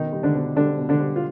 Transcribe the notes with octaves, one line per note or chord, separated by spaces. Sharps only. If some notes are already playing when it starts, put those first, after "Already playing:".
Already playing: B2 D#3 D#4
G3
D3 D4
B2
D3 G3 D4
B2
D3 D4
G3
F4